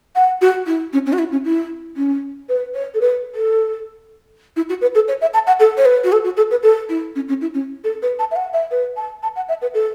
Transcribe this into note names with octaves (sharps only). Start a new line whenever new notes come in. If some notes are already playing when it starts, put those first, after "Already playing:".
F#5
F#4
E4
C#4
C#4
F#4
E4
C#4
E4
C#4
B4
C#5
A4
B4
A4
E4
F#4
B4
A4
C#5
E5
A5
F#5
A4
C#5
B4
F#4
A4
F#4
A4
B4
A4
E4
C#4
C#4
E4
C#4
A4
B4
A5
E5
F#5
E5
B4
A5
A5
F#5
E5
B4
A4